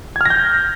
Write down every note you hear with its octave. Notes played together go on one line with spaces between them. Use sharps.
F6 G6 G#6 A#6